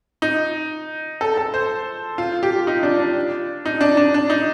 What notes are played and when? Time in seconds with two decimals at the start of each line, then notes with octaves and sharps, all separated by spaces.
0.22 D#4
1.21 A4
1.37 A4
1.54 C5
2.18 F4
2.43 G4
2.67 D#4
2.83 D4
3.00 D4
3.66 D#4
3.81 D4
3.97 D4
4.14 D4
4.30 D#4